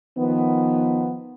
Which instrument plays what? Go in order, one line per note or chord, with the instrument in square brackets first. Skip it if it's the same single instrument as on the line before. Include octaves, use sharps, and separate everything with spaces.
[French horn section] D#3 F3 B3